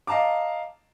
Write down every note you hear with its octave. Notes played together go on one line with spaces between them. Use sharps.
D#5 F5 A5 A#5 D6